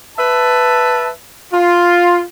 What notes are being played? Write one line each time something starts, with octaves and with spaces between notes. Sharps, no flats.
B4 E5 A5
F4